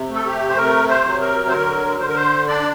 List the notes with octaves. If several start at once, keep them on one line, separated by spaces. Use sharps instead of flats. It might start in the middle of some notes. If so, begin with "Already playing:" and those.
Already playing: C3
A3
A4
G4
C5
C3 A#4
C5
F#3
A#4
C5
D3 A#4
D3 C5
A#4
C5
D4 D5